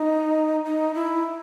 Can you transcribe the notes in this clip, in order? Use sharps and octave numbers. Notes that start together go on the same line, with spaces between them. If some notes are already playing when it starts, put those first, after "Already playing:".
Already playing: D#4
D#4
E4